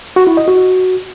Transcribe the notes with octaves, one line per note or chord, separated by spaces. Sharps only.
F#4
E4
D#5
F#4